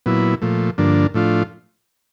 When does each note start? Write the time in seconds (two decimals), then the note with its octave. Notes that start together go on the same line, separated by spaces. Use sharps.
0.06 A#2 F#3 B3 E4
0.42 A#2 F3 A3
0.78 G2 D3 F3 A#3 D4
1.14 A2 F3 A3 D4 F4